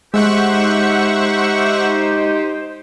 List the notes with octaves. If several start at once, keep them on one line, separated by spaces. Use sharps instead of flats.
G#3 D#4 G4 C5 E5 F#5 C#6